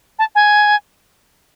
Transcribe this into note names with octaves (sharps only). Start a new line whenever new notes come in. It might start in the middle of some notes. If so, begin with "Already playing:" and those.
A5
G#5